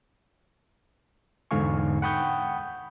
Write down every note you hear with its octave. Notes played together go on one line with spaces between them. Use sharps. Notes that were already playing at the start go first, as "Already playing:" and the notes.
E2 G#2 D3 F5 G#5 C#6
F#5 G5 B5 C#6 D#6 G6